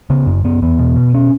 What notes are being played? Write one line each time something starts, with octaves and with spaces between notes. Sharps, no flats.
C#3 B3
F#2
F#2 B3
E2 B3
B2
B2
C#4